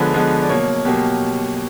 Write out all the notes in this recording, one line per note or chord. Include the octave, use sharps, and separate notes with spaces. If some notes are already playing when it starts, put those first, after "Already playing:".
Already playing: D3 F3 G#3 B3 C#5
D3 F3 G#3 B3
D5
B2 F#3 A#3 C#5
B2 F#3 A#3 G4